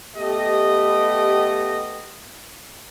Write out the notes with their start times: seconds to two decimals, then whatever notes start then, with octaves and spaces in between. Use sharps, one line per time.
0.17 A3 B3 G4 D#5